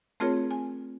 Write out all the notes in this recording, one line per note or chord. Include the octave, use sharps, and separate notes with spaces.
A3 C4 F4 G#4 A#4 C#5
G#5